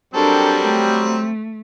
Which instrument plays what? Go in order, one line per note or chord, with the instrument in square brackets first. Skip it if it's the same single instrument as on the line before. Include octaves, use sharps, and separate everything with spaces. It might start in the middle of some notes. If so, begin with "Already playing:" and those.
[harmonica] F#3 G3 C4 [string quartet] D4 A4 A#4
[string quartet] A3